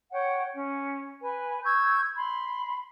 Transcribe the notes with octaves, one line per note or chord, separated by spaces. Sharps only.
C#5 F#5 G5
C#4
B4 G#5
C#6 E6 G6 G#6
B5 C6